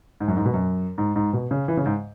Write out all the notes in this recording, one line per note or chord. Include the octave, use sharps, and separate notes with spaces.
G#2
F#2
G#2
B2
F#2
G#2
G#2
B2
C#3
E3
C#3
G#2